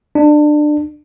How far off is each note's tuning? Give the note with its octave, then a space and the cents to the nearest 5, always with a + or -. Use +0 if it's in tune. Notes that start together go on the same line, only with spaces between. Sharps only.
D4 +25